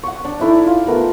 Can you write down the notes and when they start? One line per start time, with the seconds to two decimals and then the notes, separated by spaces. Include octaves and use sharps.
0.03 F#5 C#6
0.25 D4
0.40 D#4 E4 A4 D5
0.66 F4
0.87 A3 B3 A#4